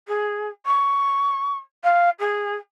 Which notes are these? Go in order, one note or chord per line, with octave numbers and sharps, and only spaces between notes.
G#4
C#6
F5
G#4